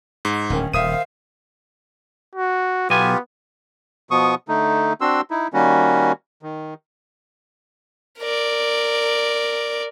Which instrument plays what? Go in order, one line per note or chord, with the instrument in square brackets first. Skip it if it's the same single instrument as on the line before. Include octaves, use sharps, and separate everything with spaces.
[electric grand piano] G#2
[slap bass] D1 [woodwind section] D#3 C#4
[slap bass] D#1 [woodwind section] D#3 C5 F5 [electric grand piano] E5 D#6 D#7
[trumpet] F#4
[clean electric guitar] B1 G#5 [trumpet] B3 [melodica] F4 G4
[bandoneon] B2 F3 B3 C#6 D#6
D3 A3 D#4
C4 D4 F#4 C6 E6
D#4 E4
D#3 G3 A#3 C#4 F#4
D#3
[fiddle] A#4 D5